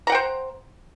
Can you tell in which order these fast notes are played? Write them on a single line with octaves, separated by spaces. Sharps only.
A#5 F#5 G5 C5